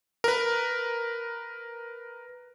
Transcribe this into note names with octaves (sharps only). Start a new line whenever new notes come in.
A#4 B4